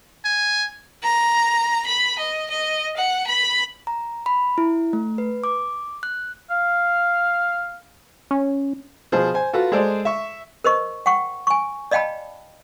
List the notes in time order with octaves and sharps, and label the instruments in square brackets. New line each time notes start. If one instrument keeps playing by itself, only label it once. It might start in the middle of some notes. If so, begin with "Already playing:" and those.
[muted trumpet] G#5
[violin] A#5
B5
D#5
D#5
F#5
B5
[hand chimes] A#5
B5
E4
A3
B4
D6
F#6
[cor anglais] F5
[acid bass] C#4
[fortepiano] B2 F3 G#4 C5
C5 G#5
F4 F#4 A4 B4
G#3 G#4 A4 C5 D5
E5 C#6
[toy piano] A#4 C5 D#5 C#6
F#5 G5 C#6
G#5 C#6
D5 D#5 F5 G5 A5 B5